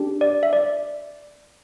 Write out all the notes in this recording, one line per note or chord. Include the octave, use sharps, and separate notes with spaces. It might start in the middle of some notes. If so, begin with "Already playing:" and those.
Already playing: D4 G4
D5
E5
D5